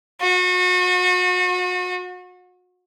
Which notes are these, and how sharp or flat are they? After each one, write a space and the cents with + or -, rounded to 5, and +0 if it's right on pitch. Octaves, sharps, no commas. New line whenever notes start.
F#4 -35